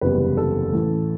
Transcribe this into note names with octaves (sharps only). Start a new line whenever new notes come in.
F#1 E2 C3 G3 B4
A4
A1 A2 E3